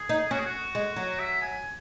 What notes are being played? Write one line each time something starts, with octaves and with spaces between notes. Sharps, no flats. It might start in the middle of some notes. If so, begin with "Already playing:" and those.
Already playing: G#4
D#4
C#4 F#4
G#4
F#4
G#3
F#3
E5
G#5